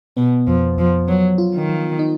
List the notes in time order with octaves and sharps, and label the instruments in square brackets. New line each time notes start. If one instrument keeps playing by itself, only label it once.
[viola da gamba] B2 [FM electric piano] B3
[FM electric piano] F2 [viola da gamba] F3
[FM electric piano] F2 [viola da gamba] F3
[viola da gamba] F#3 [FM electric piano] B3
[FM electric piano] F4
[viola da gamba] D#3
[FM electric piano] F3
D#4